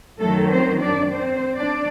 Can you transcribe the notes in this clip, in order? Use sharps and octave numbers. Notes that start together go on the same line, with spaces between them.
F#2 D#3 F#3 A3 A4
C4 C5
D4 D5
C4 C5
D4 D5